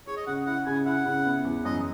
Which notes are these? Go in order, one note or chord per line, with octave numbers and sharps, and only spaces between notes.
G#4 C#5
D#5
C#3 F#5
E4 F#5
C#3 G#5
E4 F#5
C#3
B3
E2
F#2 D#5